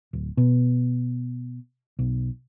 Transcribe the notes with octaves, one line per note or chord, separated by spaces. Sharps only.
D1
B2
B1